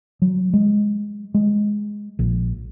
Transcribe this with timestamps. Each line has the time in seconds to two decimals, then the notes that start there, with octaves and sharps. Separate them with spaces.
0.22 F#3
0.53 G#3
1.34 G#3
2.19 A#1